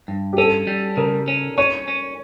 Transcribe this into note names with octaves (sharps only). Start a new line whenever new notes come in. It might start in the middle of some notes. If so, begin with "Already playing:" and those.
G2
G4
C#4 A4
G3
C#3 A#4
C#4
C#4 C#5
C#4